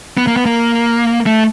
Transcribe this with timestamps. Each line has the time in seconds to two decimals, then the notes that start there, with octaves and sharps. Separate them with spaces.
0.17 B3
0.27 A#3
0.36 B3
0.46 A#3
1.26 A3